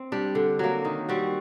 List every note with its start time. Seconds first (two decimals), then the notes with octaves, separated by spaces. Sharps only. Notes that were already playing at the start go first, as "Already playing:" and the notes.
Already playing: C4
0.12 G3 D4
0.35 D3
0.59 F#3 A#3
0.85 D#3
1.09 G3 C4 F#4